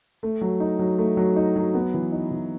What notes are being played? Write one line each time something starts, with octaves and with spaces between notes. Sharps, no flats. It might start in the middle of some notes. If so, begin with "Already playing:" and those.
A3
F#3
D#4
F#3
A3
F#3
D#4
F#3
B3
E3
D#4
E3